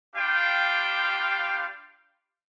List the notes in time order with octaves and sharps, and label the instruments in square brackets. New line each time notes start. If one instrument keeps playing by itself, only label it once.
[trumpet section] G3 D4 F4 G4 F5 G5